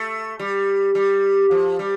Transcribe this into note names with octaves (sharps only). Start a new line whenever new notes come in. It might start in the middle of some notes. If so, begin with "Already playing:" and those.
Already playing: A3
G3
G3
F3
G3